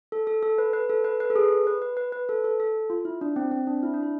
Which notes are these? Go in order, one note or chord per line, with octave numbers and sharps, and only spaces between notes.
A4
A4
A4
B4
B4
A4
B4
B4
A4
G#4
B4
B4
B4
B4
A4
A4
A4
F4
E4
D4
C4
C4
D4
E4
D4
E4